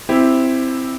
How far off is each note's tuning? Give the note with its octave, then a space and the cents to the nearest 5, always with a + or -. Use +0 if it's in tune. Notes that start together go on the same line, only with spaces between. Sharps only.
C4 +0 E4 +0 G4 +5